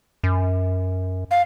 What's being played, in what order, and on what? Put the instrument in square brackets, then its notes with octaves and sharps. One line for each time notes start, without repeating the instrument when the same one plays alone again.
[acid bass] F#2
[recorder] F5